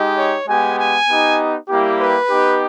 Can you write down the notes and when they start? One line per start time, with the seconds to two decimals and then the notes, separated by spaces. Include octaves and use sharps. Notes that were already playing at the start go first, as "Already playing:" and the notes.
Already playing: G#3 D#4 G4
0.17 C#5
0.48 G#3 B3 G4 G#5
0.78 G#5
1.09 B3 D#4 G4
1.69 G3 A#3 E4 G4
2.00 B4
2.29 B3 D#4 G4